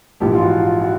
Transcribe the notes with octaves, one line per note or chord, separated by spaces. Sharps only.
A#1 G#2 E3 G4
F4
F#4
F4
F#4